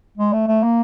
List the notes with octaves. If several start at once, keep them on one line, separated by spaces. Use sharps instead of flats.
G#3
A3
A3
A#3